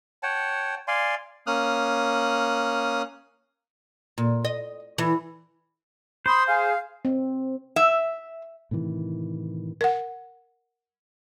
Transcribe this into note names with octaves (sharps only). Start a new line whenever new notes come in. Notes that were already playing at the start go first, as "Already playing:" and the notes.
C#5 F#5 G5 A5
D5 F5 G#5 C6
A#3 C#4 D#6 F6 F#6
A#2
D#5
E3
C5 B5 C6 D#6
G#4 F5 G#5
C4
E5
A2 C3 D#3 E3
A#4 F#5